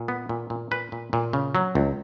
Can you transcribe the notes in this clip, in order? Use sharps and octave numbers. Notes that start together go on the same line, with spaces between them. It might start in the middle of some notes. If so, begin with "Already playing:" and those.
Already playing: A#2
B3
A#2
A#2
A#2 B4
A#2
A#2
C#3
F#3
C#2